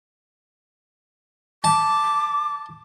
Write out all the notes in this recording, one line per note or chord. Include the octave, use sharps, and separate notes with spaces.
A5 D6